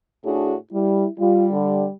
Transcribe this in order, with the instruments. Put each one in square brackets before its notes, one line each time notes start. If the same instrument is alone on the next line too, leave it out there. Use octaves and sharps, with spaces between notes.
[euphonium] A2 [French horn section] D4 F#4 G#4
[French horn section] G3 [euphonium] E4
[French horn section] G3 [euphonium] F4
[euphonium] D3